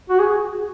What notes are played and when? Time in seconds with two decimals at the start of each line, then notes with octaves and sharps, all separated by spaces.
0.10 F#4
0.19 G#4